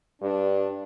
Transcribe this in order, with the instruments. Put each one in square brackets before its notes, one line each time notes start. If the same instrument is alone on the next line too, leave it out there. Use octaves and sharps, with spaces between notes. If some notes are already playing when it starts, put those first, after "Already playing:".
[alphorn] G2 [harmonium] D4